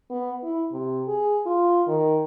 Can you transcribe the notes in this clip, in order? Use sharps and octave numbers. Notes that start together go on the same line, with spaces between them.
B3
E4
C3
G#4
F4
D#3